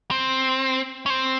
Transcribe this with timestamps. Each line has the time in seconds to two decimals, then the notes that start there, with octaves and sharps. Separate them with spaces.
0.11 C4
1.06 C#4
1.10 C4